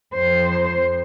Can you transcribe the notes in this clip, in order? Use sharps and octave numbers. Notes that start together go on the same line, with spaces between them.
F2 C5